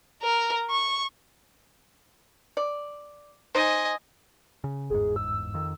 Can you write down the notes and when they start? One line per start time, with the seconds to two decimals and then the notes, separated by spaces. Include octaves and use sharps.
0.23 A#4
0.70 C#6
2.57 D5
3.55 D#4 C5 D#5 G#5
4.64 C#3
4.90 G1 E2 G#2 G#4
5.16 E6
5.54 F2 D#3